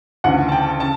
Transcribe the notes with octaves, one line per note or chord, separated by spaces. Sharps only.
D2 C#3 E3 F#5
A5
G5
C#3 A5